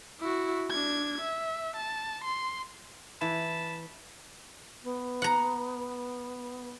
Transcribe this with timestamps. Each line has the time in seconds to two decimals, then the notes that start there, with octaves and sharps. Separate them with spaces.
0.21 E4 F#4
0.70 D4 G#6
1.21 E5
1.77 A5
2.25 C6
3.21 E3 A5 B5
4.83 B3
5.22 F#5 A#5